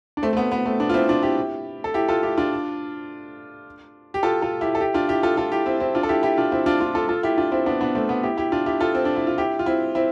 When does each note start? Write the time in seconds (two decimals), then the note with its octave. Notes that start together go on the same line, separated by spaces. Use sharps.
0.17 D4
0.22 A3 C4
0.33 A3
0.37 B3
0.52 B3
0.66 A3 C4
0.80 B3 D4
0.89 F4
0.94 C4 E4
1.08 D4 F4
1.23 E4 G4
1.84 A4
1.94 E4 G4
2.09 F4 A4
2.23 E4 G4
2.37 D4 F4
4.14 G4
4.23 F4 A4
4.42 F4 A4
4.61 E4 G4
4.75 A4
4.80 E4 G4
4.94 D4 F4
5.09 E4 G4
5.23 F4 A4
5.37 F4 A4
5.52 E4 G4
5.66 C4 E4
5.80 C4 E4
5.95 D4 F4
6.03 A4
6.09 E4 G4
6.23 E4 G4
6.37 D4 F4
6.52 C4 E4
6.66 D4 F4
6.80 D4 F4
6.95 F4 A4
7.09 F4 A4
7.23 E4 G4
7.38 D4 F4
7.52 C4 E4
7.66 B3 D4
7.81 B3 D4
7.95 A3 C4
8.09 B3
8.23 E4 G4
8.37 E4 G4
8.52 D4 F4
8.66 E4 G4
8.80 F4 A4
8.95 C4
9.05 D4
9.16 E4
9.27 F4
9.38 E4 G4
9.59 F4
9.66 C4 E4
9.95 C4 E4